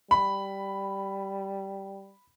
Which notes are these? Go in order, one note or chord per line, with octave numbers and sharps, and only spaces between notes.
G3 B5